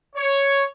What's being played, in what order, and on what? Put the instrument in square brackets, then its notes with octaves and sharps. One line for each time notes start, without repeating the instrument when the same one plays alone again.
[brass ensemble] C#5